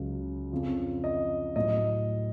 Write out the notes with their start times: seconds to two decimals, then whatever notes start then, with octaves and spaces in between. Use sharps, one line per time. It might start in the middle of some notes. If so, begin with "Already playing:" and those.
Already playing: C#2 C#3 F#3
0.51 F2 C#3 F3
1.04 D#5
1.56 A2 F#3 D#5